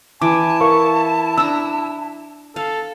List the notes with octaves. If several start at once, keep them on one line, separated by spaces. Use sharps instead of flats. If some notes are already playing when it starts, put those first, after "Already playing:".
E3 G#5 A5 D6
E4 A#4 F5 C#6
D4 A#5 E6
A4 F5